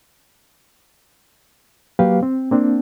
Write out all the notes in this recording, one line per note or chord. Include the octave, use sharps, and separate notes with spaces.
F#3 A#3 G4 B4 F5
C4
A#3 C4 D4